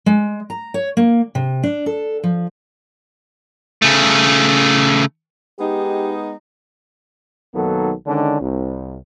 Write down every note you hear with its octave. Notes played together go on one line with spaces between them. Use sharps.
G#3
A#5
C#5
A#3
C3
D4
A4
F3
C#3 A3
G#3 B3 D#4 G4
B1 D#3 F#3 A#3 B3 A4
D3 D#3 G#3 C#4 D4
C2